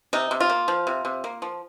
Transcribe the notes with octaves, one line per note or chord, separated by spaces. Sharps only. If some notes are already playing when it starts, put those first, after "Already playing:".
C3 D#4
C3
F4
A#3
F3
C3
C3
A#3
F3